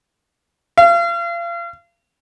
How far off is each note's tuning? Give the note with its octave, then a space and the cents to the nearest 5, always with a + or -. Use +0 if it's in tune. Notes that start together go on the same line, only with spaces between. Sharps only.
F5 -35